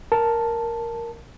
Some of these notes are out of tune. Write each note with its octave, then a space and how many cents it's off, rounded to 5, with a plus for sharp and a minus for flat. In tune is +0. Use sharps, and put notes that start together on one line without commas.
A#4 +0 A5 +0